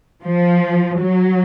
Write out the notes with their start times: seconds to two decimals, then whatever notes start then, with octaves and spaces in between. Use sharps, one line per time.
0.23 F3
0.99 F#3